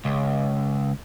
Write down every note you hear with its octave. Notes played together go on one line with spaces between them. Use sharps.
C#2